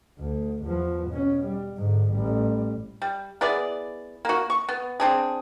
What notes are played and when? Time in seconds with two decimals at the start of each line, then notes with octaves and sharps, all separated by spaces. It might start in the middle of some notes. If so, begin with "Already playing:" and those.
0.19 D2
0.63 E2 F3
1.08 B2 C#4
1.45 G3
1.78 G#2 D3
2.12 A1 G3
3.02 G3
3.41 B3 E4 G#4 D5
4.25 A#3 F#4
4.50 C#6
4.69 B3
5.00 C4 D4 G#4